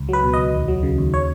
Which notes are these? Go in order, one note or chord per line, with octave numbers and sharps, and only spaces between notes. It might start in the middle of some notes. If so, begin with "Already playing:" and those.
Already playing: C#2
F#3 B4
B2
C#2 D#5
D#2
F#3
C#3
D#2
C#5